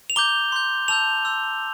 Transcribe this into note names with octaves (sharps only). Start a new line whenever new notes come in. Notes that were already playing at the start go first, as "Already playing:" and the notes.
F7
A#5 D6 G6 G7
C6 G6
A5 E6 G6 F7
C6 E6 G6